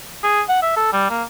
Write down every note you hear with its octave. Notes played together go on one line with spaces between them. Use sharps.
G#4
F#5
E5
A4
G3
A#3